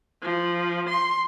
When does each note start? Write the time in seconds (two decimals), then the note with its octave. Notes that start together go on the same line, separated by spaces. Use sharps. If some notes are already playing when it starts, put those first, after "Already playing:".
0.22 F3
0.88 C6